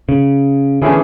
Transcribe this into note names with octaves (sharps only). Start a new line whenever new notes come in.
C#3
D3 E3 A3 C#4 E4 G#4